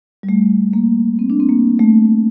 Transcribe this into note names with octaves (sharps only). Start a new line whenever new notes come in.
G3
A3
A#3
C4
D4
C4
A#3
A3